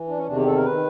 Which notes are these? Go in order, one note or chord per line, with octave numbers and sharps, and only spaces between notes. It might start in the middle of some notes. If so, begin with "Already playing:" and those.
Already playing: E3
D4
C#4
E2 C3 D#3 D4
G4
A4
A#4
D#3 B4